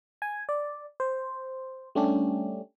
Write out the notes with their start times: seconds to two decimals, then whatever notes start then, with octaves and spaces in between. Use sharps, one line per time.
0.22 G#5
0.49 D5
1.00 C5
1.95 G3 A3 C#4 D4 G4